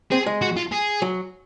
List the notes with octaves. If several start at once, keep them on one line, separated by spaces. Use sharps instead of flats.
C4 G#4
G#3
F#4
F4
G#4
F#3